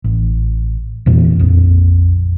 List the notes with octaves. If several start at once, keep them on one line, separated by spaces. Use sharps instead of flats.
A1
E2 A#2 E3 C4
A#1 F2